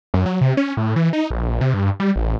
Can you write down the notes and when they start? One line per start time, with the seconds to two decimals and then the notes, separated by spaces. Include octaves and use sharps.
0.14 F#2
0.26 F#3
0.41 C3
0.57 C#4
0.77 A2
0.96 E3
1.13 D#4
1.31 A#1
1.61 C3
1.74 G2
2.00 G3
2.16 A1